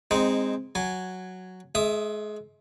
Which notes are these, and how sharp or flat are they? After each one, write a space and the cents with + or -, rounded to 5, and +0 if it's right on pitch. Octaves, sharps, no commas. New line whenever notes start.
G#3 -20 C4 +0 D#4 +0
F#3 +0 G#5 +0
G#3 +30 E5 +0 D#6 +0